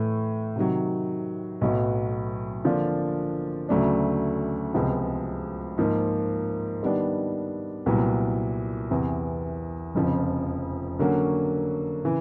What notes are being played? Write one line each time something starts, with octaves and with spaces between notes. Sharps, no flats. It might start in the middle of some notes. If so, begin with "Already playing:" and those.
Already playing: A2 E3 A3
C3 D#3 F#3
B1 A2 F#3 B3
D3 F3 A#3 D4 F4
D2 C#3 F#3 A3 D4
C#2 C3 F3 G#3 B3
G#2 F3 A#3
D#3 G3 B3 D4
C2 A#2 F#3 B3 E4
E2 C3 E3
F1 F2 C#3 F3
D3 F#3 A#3 C#4 F#4
C#3 E3